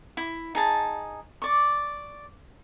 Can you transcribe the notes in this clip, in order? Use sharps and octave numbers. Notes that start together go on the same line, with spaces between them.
E4
D#4 G#4 A5
D5 C#6